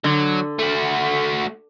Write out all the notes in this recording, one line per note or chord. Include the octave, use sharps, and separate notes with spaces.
D3 F#3
A3 F#4